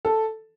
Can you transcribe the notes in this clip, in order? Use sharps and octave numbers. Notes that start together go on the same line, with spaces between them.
A4